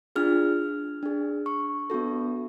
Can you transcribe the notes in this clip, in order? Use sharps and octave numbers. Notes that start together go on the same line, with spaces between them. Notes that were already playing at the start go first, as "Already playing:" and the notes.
D4 F4 G#4 F6
D4 G#4
C#6
B3 D4 F#4 A4